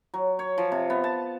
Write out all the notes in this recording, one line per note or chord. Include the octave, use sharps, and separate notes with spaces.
F#3
C#5
F3
C3
B3
A5